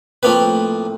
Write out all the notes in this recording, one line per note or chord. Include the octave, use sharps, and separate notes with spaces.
A2 F3 A#3 C4 B4